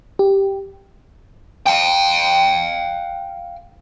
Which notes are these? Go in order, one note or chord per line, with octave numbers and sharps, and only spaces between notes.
G4
F5 G5